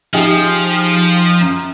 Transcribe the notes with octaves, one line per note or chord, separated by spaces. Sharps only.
F3 D#4 G4 G#4
F#2